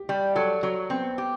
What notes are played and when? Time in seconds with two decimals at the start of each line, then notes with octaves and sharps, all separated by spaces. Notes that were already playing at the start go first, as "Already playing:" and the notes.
Already playing: G4
0.09 G3
0.35 F#3 A4
0.63 F#3
0.90 B3 C4
1.18 G4